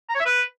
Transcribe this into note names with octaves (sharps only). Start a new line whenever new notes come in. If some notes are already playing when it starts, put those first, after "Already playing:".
A#5
C#5
E5
B4